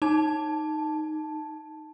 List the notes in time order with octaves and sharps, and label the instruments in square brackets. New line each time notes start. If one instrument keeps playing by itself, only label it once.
[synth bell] D#4 A5